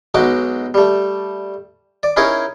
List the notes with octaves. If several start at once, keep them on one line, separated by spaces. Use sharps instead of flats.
B1 G#3 D#4 F#4 D6
G3 A3
D5
C#4 D#4 E4 G#4 A#4 C#5